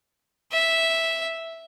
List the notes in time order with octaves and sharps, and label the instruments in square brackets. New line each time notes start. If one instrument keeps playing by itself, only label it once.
[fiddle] E5